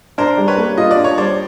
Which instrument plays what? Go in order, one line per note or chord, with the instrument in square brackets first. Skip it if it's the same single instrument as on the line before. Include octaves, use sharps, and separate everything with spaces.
[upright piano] D4 [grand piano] A#4 C5
[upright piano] G3
[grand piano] B4 C#5
[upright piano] A#3
[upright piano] F4 [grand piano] D#5
[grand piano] D5
[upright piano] D4
[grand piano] C#5
[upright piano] G3 [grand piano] C5 D5